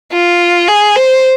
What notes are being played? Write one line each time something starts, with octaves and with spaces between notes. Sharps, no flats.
F4
G#4
C5